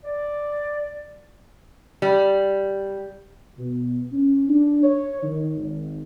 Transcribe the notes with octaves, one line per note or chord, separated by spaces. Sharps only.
D5
G3
B2
C#4
D4
C#5
D#3
G#1